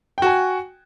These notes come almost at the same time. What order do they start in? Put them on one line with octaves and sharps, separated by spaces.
G5 F#4 G#5